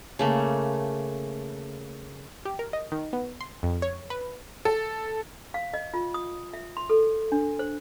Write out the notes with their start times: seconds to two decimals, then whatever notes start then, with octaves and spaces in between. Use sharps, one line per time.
0.19 C#3 A3 A#3
2.45 G4
2.59 A#4
2.73 D#5
2.92 D#3
3.13 B3
3.41 C6
3.63 F2
3.82 C#5
4.10 B4
4.65 A4
5.54 F5
5.74 D#5
5.94 F4
6.14 D#6
6.53 E5
6.77 C6
6.90 A4
7.32 D4
7.59 C5